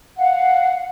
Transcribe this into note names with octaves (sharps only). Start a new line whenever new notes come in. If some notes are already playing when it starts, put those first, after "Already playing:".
F5 F#5